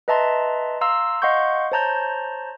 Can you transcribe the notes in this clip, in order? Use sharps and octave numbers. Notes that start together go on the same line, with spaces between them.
B4 D#5 E5 A5 A#5 C6
F5 A#5 C6 E6
D#5 F5 F#5 C6 C#6 G6
C5 C#5 A5 A#5 G6